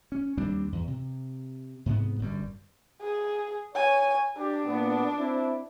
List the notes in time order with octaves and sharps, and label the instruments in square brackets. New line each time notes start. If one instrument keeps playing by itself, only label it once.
[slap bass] C#4
D#2 G3 C4 D4
E2
C3
G#2 C3 A#3 B3
G1 F#2 G3
[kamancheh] G#4
[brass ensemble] C#5 [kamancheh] G#5
[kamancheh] D4 [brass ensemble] G4
[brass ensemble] A#2 B3
C4 E4